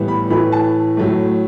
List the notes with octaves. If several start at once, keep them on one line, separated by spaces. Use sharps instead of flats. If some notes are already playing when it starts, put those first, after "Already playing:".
Already playing: A2 E3 G3 B3
B5
A2 E3 A3 B5
A5
A2 F#3 A3